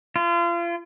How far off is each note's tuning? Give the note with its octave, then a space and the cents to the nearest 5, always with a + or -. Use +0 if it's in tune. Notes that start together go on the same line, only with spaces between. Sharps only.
F4 -35